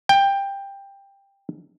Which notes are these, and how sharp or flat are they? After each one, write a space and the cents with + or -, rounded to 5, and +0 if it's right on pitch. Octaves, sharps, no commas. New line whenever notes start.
G5 +15